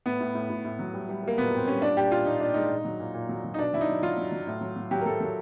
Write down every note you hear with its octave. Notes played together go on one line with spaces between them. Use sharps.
A2 B3
A2
A2
A2
A2
F#3
G3
G3
G3 A#3
A#2 B3
A#2 C4
G3 C#4
A#2 D4
A#2 G4
A#2 F4
A#2 D#4
A#2 D4
G#3 D#4
A#2
F#3
A#2
A#2
F#3
F#3
D#4
B2 D4
F#3 E4
D#4
F#3
F#3 F4
F#3
F#3
A2
F#3
F#3
F#3 G4
A#4
F#3 A4
F#3